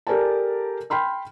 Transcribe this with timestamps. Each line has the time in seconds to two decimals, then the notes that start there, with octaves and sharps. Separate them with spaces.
0.07 G4 A4 A#4 D5 G#5 A5
0.90 G5 B5 C6 F6